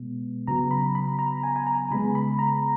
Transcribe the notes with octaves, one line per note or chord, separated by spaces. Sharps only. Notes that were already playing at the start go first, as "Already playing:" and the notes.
Already playing: B2 G#3 B3
C#3 F#3 B3 A#5
B5
B5
A#5
G#5
G#5
A#5
C#3 G#3 B3 B5
B5
A#5